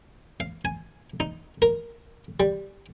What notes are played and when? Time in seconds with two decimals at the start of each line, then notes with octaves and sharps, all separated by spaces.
0.40 F5
0.65 G#5
1.20 D#4
1.62 A#4
2.40 G3